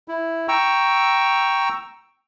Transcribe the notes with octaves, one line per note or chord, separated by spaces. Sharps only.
E4
G5 A#5 C#6 E6